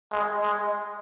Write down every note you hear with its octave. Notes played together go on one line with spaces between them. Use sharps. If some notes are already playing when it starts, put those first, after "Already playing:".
G#3
G#3